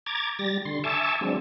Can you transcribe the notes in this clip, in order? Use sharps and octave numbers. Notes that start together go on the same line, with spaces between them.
A#5 D6 G#6 A6
G3 A6 A#6
D3 C6
E5 G#5 A5 C#6 D6 E6
F#3 G#3 C4 D4